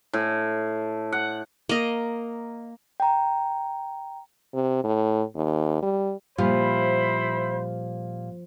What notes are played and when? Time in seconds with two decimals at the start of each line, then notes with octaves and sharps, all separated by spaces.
0.13 A2
1.12 F#5
1.69 A#3 D#5
3.00 G5 A#5
4.54 C3
4.84 A2
5.35 D#2
5.82 G3
6.38 A#2 F3 G3 E4 C5 B5